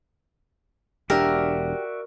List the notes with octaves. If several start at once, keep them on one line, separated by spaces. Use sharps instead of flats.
E1 D4 F#4 G4 A#4 D5 E5